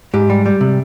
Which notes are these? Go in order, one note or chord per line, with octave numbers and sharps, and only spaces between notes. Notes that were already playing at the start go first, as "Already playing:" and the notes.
G#2 G4
G3
G3
C3